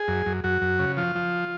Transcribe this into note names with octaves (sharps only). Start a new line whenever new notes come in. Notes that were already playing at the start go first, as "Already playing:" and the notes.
Already playing: G#4
F#2
F#2
F#2 F#4
F#2
C#3
F3 F4
F3